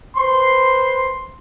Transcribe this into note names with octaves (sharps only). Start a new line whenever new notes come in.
B4 C5 C6